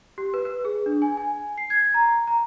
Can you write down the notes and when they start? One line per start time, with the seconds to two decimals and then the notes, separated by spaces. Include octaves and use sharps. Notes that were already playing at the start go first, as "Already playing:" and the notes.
0.18 G4
0.34 B4
0.45 B4
0.65 G#4
0.86 D4
1.02 G#5
1.17 G#5
1.58 C7
1.70 G#6
1.94 A#5
2.27 A#5